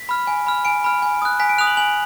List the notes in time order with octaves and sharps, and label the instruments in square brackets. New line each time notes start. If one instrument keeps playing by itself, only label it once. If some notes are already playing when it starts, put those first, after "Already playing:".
Already playing: [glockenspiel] B6
B5 F6
G#5
B5 F6
G#5 D7
B5 F6
G#5
D#6 F#6
G#5 B6
D7
D#6 F#6 F7
F#7
G#5 F#7